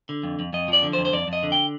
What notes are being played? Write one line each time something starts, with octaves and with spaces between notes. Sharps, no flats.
D3
F2
F2
F2 D#5
F3 D5
D3
C5
F2
C5
F2 D5
F2
D#5
D3
G5